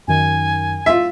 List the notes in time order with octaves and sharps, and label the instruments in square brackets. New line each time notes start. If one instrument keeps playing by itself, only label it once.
[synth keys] F#2 D#3 [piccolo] G#5
[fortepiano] F4 E5